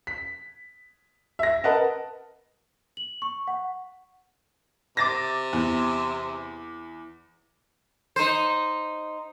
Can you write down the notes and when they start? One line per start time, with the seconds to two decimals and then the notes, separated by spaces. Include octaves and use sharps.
0.07 B6
1.39 E5 A#6
1.64 A#4 B4 D#5 F#5 A5
2.97 F#7
3.22 C#6
3.48 F#5
4.97 C3 D6 A6 A#6
5.53 E2
8.16 D#4 C5